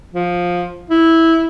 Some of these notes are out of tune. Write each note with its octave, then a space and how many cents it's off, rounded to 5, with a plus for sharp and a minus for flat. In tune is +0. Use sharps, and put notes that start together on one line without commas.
F3 +15
E4 -10